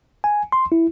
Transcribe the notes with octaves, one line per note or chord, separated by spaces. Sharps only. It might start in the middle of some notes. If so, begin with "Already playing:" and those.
G#5
C6
E4